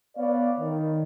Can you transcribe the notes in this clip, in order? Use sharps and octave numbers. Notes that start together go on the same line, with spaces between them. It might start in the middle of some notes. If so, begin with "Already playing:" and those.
B3 B4 C#5 D5 F5
D#3